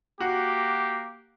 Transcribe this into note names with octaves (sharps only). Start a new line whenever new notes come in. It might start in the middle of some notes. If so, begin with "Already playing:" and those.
A#3 F#4 G4